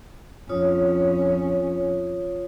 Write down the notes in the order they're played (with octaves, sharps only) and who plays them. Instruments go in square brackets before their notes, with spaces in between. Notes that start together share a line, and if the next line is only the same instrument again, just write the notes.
[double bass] F2 C#4 [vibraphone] F4 C#5 D#6